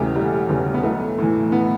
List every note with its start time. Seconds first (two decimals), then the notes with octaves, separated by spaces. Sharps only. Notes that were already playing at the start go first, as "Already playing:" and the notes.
Already playing: E1 E2 C#3 E3 A3 F#4 G4
0.14 E1 G3
0.49 E2 C#3 E3 G3
0.74 B3
0.83 B1 A3
1.18 A2 E3
1.52 B3